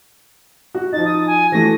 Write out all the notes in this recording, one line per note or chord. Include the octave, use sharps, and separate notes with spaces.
F#4
F3 D#4 A6
D#6
G#5
E3 A3 F#4 A#6